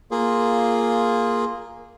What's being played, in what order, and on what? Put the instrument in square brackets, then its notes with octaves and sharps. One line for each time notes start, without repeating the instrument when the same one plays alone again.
[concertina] A#3 F4 G#4